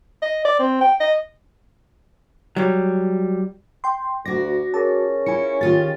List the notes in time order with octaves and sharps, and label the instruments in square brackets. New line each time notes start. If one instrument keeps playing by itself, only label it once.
[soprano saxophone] D#5
D5
C4
G5
D#5
[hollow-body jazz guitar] F#3 G3
[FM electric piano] G5 C6
[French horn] D2 [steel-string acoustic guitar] F#4 D5 [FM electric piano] A#6
[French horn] C#4 [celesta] G#4 A#4 A#6 [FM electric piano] A5
[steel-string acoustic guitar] E4 F4 [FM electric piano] G#5 C#7
[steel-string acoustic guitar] D#3 F4 G4 [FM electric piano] A6